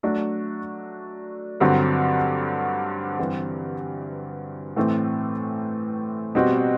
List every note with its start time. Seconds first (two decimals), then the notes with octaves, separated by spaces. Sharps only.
0.03 F#3 A3 D4 F#4
1.60 G2 D3 F#3 C4 F#4
3.18 G2 E3 G3 C4
4.76 A2 E3 A3 C4
6.35 B2 G3 C4 F#4